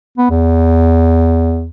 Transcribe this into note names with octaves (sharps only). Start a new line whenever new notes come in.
B3
E2